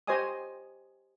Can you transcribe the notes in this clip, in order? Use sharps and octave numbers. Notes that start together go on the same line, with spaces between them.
G4 C5 C#5 D#5 G#5 D#6